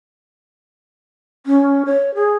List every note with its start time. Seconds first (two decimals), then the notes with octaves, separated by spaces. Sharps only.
1.46 C#4
1.86 C#5
2.15 G#4